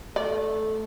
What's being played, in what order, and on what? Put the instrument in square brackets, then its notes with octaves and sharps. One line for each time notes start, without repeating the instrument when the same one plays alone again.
[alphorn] A3 [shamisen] D5